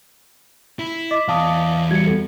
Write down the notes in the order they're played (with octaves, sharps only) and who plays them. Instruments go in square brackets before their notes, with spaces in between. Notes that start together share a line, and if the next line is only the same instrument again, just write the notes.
[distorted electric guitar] E4
[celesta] D#5 D6 B6
[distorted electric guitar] E2 D5 [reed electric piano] F5 A5 D#6
[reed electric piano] G3 F#4 [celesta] G#6 C#7
[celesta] A4